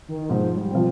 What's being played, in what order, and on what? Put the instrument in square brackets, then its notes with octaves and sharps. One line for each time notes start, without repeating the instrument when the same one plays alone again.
[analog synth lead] D#3
[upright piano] G#2 [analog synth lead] F3
[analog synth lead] G3
[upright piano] F3 C4